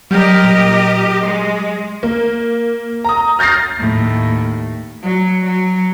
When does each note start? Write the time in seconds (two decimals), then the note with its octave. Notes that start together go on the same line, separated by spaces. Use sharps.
0.11 F#3 G3 G4 A#4 D#5 F6 G6
0.44 A#2
1.23 G#3 C6
2.03 A#3
3.05 A#5 D#6
3.39 F6 G6 A6 A#6 C7
3.79 D#2 A2
5.02 F#3
5.45 F#3